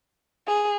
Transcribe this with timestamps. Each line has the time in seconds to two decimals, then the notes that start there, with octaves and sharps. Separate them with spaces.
0.48 G#4